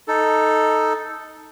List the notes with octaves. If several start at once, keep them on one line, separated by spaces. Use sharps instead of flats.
D#4 A4